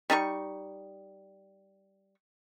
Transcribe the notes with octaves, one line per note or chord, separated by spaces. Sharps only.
G3 D#4 A4 C#6